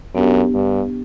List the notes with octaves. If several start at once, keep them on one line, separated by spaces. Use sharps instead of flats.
F#2 B3 D4 G4
G2